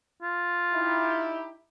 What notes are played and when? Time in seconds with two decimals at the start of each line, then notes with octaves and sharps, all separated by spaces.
0.22 F4
0.73 D#4 E4 G4